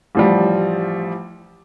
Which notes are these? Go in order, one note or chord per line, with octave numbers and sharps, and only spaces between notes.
A1 F3 G3